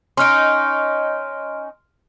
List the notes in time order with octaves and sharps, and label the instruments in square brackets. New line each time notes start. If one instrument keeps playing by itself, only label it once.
[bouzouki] C#4 D#4 [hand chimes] C6 F6 D7